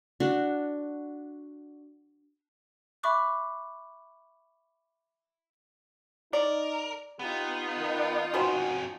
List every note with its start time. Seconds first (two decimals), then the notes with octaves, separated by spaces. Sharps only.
0.20 D4 F#4
3.03 E5 B5 C#6 D6 F#6
6.33 D#4 A#4 D5
7.19 B3 D#4 F4 G4 D#5
7.78 D#3
8.34 F2 D#3 C#4 F#4 B4 C5